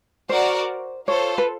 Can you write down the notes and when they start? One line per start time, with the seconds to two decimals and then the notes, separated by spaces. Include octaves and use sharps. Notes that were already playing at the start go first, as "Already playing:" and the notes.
0.29 F#4 A#4 C5 D5
1.08 F4 A4 C5 C#5
1.38 B4